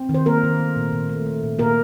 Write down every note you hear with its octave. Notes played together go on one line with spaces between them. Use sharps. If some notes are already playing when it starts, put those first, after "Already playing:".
Already playing: C4
D#3
C5
A#3 A#4
D#3
A3
A#2
A#2
A3
A3
A#2
A#2 A#3 A#4